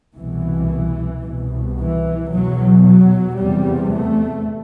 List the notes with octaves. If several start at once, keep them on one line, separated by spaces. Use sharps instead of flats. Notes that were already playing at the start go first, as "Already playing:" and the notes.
C2 B2 E3
C2 B2
E3
E2 B2 F#3
F#3
E2 C3 G3
A3